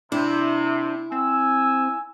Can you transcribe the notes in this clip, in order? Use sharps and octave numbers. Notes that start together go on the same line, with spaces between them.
C3 D4 E4
C4 G#5 E6